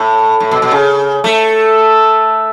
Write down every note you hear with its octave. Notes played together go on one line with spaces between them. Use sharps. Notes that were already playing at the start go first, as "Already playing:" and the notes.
Already playing: A2
A2
B2
B2
C#3
A3